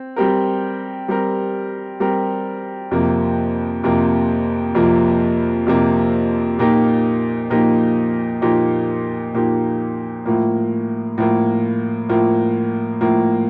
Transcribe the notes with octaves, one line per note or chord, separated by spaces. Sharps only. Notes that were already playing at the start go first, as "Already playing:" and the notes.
Already playing: C4
G3 C4 G4 A#4
G3 C4 G4 A#4
G3 C4 G4 A#4
F2 C3 F3 A#3
F2 C3 F3 A#3
F2 C3 F3 A#3
F2 C3 F3 A#3
A#2 F3 A#3 D#4 G4
A#2 F3 A#3 D#4 G4
A#2 F3 A#3 D#4 G4
A#2 F3 A#3 D#4 G4
A2 F3 A#3
A2 F3 A#3
A2 F3 A#3
A2 F3 A#3